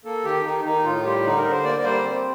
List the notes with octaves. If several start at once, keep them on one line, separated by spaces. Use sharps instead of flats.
A#3 A4
D#3 G4
D#3 D#4
D#3 D#4
A2 F4
G3 G4
D3 D#4
A#4
D3
C5
A#3 D5
G3 C5
C4